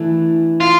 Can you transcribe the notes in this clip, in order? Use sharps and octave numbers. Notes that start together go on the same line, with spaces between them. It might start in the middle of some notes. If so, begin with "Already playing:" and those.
Already playing: E3 A3 D4
F4